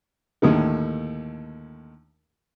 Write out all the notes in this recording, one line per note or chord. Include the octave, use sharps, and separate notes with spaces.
D#2 A2 D3 D#3